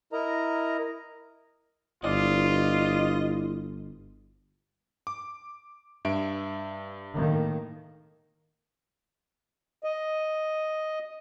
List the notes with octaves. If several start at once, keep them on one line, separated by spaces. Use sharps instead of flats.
E4 A#4 D#5 A#5
G1 E4 F4 C5 D5 D#5
D6
G2 E5 D7
A2 D#3 A#3
D#5